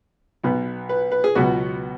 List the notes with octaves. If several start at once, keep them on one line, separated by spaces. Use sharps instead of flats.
B1 B2 B3
B4
B4
G#4
C#2 B2 F#3 B3 F#4